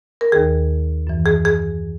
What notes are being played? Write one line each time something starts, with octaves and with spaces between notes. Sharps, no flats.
A#4
D#2 D#3 G#4
F#2 E3
G#4
G#4